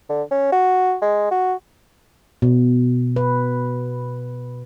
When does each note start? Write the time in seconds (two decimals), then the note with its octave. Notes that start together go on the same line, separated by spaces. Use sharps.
0.10 D3
0.31 C#4
0.53 F#4
1.02 G#3
1.31 F#4
2.42 B2
3.16 B4